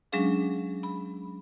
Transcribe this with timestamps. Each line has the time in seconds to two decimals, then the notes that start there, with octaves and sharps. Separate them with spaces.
0.12 F#3 G#3 C#4 D4 G#4 F5
0.83 B5